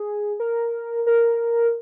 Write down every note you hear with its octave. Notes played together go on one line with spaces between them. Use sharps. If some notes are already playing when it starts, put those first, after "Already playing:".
Already playing: G#4
A#4
A#4